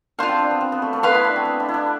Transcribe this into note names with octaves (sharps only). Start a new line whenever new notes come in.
D4 F4 C5 F5
C4
D4
B3
C4
B3
A3
A3
B3 B4 F5 C6
E4
D4
C4
B3
D4
E4
D4